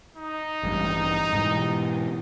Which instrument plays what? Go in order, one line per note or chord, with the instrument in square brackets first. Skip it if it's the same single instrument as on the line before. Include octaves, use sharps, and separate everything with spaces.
[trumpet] D#4
[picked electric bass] A1 G2
G#2 B2 E3